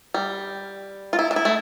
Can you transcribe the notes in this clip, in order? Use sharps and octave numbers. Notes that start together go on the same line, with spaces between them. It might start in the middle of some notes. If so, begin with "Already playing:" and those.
G3
F4
E4
D4
E4
A3